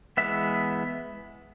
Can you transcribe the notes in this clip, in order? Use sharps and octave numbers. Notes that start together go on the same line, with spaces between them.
E3 G#3 B3 E5